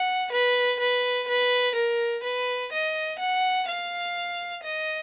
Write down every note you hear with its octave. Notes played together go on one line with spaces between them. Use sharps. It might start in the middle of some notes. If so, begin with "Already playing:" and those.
Already playing: F#5
B4
B4
B4
A#4
B4
D#5
F#5
F5
D#5